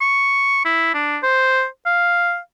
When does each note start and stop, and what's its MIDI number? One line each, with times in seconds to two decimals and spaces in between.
0.01 0.64 85
0.65 0.92 64
0.94 1.18 62
1.23 1.65 72
1.86 2.38 77